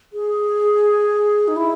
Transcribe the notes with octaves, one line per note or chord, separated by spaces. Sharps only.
G#4
D#4
E4